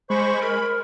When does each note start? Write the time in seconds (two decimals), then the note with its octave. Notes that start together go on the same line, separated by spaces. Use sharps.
0.10 G#3 C5 B5 C#6
0.41 A#4 B5